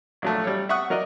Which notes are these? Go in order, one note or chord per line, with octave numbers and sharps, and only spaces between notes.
A#1 F#3 A3
G3 C#5
E5 F#5 C#6 D#6 F#6
F#3 A#4 D5 D#5